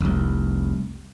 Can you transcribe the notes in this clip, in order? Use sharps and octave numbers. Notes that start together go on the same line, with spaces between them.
F1 C2